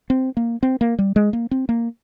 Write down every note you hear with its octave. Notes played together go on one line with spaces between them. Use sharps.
C4
A#3
C4
A#3
G3
G#3
A#3
C4
A#3